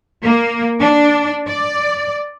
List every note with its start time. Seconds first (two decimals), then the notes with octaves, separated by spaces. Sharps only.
0.23 A#3
0.80 D4
1.48 D5